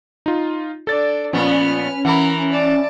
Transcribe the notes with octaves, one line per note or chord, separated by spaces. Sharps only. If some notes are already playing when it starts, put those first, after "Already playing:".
D#4 F4
D4 A4 D5 A6
A#2 F3 B3 C#4 B4 F6
E3 A#4 F#5 B5
D5 A5